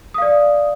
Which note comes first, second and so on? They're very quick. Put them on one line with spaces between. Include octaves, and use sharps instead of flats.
D#6 F5 D5